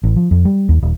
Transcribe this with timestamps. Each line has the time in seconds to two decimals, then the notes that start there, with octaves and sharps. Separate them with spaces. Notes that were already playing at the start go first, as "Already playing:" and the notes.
0.03 A1
0.16 F3
0.31 F2
0.45 G3
0.69 D#2
0.82 D#1